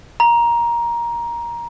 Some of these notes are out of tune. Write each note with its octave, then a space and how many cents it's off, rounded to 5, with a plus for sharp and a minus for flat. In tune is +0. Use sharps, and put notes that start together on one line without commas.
A#5 +15